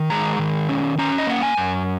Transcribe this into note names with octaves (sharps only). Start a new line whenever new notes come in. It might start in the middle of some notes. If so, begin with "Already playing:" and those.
Already playing: D#3
G#3 A#5
D#3
C#4
C#4 A#5
D#5
A#3 F#5
G#5
F#2